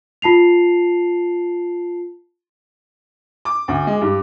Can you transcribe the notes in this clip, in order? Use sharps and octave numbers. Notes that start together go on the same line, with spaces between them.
F4 A5 C7 F7
D6
D2
G#3
G2